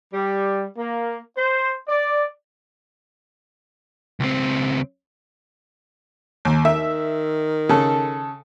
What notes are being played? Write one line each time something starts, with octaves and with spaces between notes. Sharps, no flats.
G3
A#3
C5
D5
C#2 C4
D#2
D#3 E5
C#3 A4